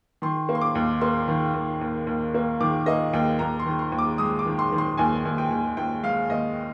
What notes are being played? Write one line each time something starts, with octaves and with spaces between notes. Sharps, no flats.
D#3 C6
A#3
C6
D6
D#2
A#3 C6
D#3
D#2
D#2
D#2
A#3
D#3 D6
A#3 D#5
D#2 G5
D#2 A#5
C6
D#3
C6
D#2
D6
G#3 D#6
D6
D#3
C6
D#3
C6
D#2 G#5
D#2
G5
D#2
D#2 G5
G#3 F5
D#2 D#5